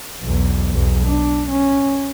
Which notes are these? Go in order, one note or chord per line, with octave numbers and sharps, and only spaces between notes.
B1 E2
B1 E2
D4
C#4